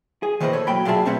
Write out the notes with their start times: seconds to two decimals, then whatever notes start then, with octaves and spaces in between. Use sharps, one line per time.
0.23 G#4
0.40 D#3 E3 A#3 B4 C5 D#5
0.53 A4 C#5
0.67 F#3 A#3 G5 B5
0.85 A#2 F#3 F4 G#4 E5 A5
1.05 A3 C4 C#4 B4 C#5